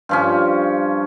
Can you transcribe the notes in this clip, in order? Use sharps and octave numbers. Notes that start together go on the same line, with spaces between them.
G2 F3 C#4